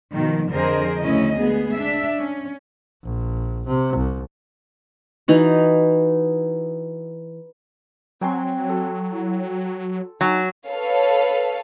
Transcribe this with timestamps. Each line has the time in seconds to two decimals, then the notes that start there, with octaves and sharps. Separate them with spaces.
0.13 B2 D#3 F3
0.50 F2 D3 G#4 A#4 C5 D#5
0.98 D2 C#3 C#4 E4 D#5
1.37 G#3 B3 G#4
1.74 D4 E5
2.19 C#4
3.03 A#1
3.67 C3
3.96 C2
5.28 E3 D#4 F#4
8.21 F#3 C4 G5 G#5 C6
8.69 A4
9.12 E4
9.50 F#4
10.21 F#3 D#4 F#5 G#5
10.67 A4 B4 C#5 F5